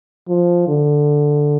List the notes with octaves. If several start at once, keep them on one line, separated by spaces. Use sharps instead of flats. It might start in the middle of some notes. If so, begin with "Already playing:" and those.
F3
D3